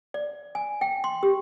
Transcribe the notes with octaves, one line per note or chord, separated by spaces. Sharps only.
D5
G#5
G5
C6
G4